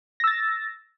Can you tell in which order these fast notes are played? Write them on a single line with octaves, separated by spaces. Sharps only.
A#6 E6 A6